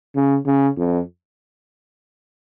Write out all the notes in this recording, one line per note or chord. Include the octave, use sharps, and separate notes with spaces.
C#3
C#3
F2